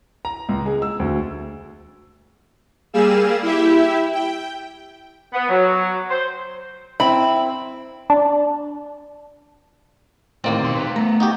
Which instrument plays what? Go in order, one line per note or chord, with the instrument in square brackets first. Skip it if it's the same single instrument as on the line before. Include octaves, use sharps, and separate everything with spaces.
[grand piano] A#5
C#2
G#3
E6
D2
[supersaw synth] G3 A#3 G#4 F5 E6 E7
E4 G4 E5
G5
[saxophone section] B3
F#3
C5
[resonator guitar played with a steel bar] C4 E4 [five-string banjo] B5
[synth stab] D4
[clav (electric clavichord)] D#2 A#3 C4 [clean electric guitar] A2 D5 D#5
[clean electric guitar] B2 C6
B4 F5
[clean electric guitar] A3 B3 [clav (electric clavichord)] A#5
[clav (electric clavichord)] D#4 F#4 G4